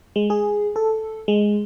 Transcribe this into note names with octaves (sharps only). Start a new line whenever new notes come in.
G#3
G#4
A4
G#3